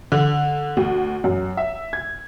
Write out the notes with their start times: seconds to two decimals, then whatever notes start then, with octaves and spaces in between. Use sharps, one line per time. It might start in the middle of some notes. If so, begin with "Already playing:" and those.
0.12 D3
0.77 D2
1.24 F#2
1.57 E5
1.93 G#6